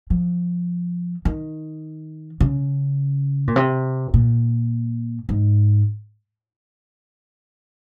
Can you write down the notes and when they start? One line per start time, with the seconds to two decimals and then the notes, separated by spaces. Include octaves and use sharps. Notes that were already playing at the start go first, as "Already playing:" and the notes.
0.10 F3
1.25 D#3
2.40 C#3
3.47 A#2
3.56 C3
4.14 A#2
5.29 G#2